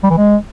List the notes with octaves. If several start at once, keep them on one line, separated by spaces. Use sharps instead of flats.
G3
E3
G#3